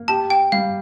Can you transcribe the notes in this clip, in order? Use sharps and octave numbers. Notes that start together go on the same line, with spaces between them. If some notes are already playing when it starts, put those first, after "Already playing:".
Already playing: A#3
G4 A5
G5
G3 F5